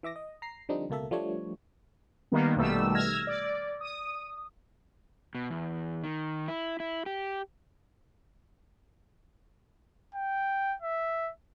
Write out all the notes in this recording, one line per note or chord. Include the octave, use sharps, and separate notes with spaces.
E3 E5 D6 A#6
D#5
A#5 C7
D3 F3 G3 C4 D4 D#4
C#2 B2 A#3 A4 E5
F3 G3 A3 D4 C#5
D#3 G3 A#3 B3
A#1 B2 D#3 G3 A3 E6
E6 F6 G#6 A#6
D5
D#6
B2
E2
D#3
E4
E4
G4
G5
E5